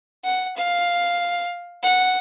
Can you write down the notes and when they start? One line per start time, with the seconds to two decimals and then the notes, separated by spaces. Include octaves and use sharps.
0.25 F#5
0.57 F5
1.83 F#5